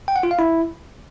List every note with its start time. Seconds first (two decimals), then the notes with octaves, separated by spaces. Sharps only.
0.08 G5
0.16 F#5
0.23 F4
0.31 F5
0.39 E4